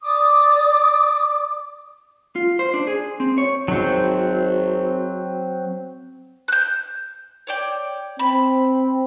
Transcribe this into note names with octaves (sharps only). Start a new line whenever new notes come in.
D5 D6 D#6
F4
C5
D4
G#4
C4
C#5
G#1 F#3 C4
F#6 G6
C#5 D5 G5
C4 B5